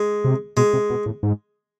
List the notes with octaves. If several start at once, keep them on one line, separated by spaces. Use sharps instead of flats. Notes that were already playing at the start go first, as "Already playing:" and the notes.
Already playing: G#3
C3
B2 G#3
C3
B2
A2
G#2